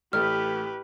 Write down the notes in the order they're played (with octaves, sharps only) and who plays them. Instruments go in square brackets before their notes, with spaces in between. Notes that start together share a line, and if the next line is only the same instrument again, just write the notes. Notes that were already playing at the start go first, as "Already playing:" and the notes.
[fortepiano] A1 A3 D#6 [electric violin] G4 B4 [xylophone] F6